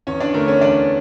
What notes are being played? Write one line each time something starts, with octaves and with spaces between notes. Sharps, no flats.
E2 C#4 C#5
D4 D5
D3 A3 A#4
C#4 C#5
E2 D4 D5